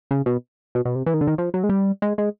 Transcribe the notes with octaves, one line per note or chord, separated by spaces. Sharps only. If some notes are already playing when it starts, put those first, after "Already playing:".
C#3
B2
B2
B2
C3
E3
D#3
D3
D#3
F3
F#3
G#3
G3
G#3
G#3